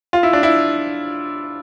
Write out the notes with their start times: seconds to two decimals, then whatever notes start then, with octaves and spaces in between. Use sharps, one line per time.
0.13 F4
0.23 E4
0.33 D4
0.43 E4